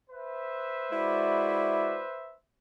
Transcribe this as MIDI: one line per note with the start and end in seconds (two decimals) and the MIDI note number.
0.10 2.36 71
0.10 2.36 72
0.10 2.36 76
0.92 2.04 56
0.92 2.02 64
0.92 2.04 66
0.92 2.04 74